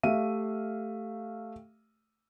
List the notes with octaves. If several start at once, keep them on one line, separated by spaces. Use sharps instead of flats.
A3 G4 E5 F5 D#7